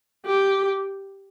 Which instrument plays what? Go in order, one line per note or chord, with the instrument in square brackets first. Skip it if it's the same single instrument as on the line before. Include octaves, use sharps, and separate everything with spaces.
[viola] G4